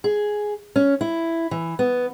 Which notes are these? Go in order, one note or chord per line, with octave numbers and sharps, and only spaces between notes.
G#4
C#4
E4
E3
B3